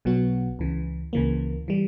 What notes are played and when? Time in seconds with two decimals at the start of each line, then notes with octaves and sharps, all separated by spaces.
0.05 B1 B2 F#3 B3 F#4
0.59 C#2 C#3 E3
1.13 C#2 C#3 E3 A#3
1.68 E3 G3